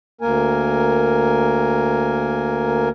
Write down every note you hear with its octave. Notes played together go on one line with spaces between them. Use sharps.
D2 A#3 A#4 G#5